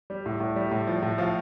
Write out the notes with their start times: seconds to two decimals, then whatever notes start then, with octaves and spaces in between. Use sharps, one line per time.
0.10 G3
0.26 A2
0.40 A2
0.56 G3
0.71 A2
0.87 F3
1.03 A2
1.18 F3 F5